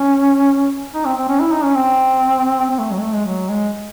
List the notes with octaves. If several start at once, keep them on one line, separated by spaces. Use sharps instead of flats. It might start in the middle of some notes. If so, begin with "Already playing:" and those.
Already playing: C#4
D#4
C4
C4
C#4
E4
D#4
C#4
C4
C4
A3
F#3
G#3
A3
G#3
F#3
G#3